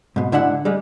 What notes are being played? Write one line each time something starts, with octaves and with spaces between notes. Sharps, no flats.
G#2 B2
G#2 D3 D4 E4 F#5
G3 G#3